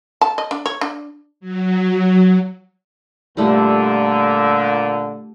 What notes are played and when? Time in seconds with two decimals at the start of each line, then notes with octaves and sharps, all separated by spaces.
0.21 A5
0.38 D#5
0.51 D4
0.66 C#5
0.81 D4
1.40 F#3
3.37 A#2 D3 G3 A3